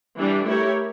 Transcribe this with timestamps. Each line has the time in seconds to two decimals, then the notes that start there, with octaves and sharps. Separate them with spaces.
0.18 E3 G3 D4 G4
0.46 A3 E4 G4 A#4 C#5